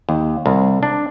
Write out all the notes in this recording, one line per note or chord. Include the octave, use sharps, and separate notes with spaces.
D#2
C2
D4